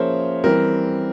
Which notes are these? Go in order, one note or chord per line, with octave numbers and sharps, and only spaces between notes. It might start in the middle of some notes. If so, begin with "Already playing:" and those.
Already playing: F3 A#3 C#4 G#4 A#4 C5 C#5 E5
E3 G3 C4 A#4